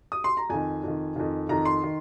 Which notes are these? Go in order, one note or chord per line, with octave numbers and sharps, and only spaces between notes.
D#6
C6
A#5
F2 D#3 G#5
F2 D#3
F2 D#3
F2 D#3 A#5
C6
D#3